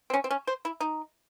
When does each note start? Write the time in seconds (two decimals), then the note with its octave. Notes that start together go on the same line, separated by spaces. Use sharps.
0.10 C4
0.14 C#4
0.24 C4
0.31 C#4
0.47 C5
0.65 E4
0.80 D#4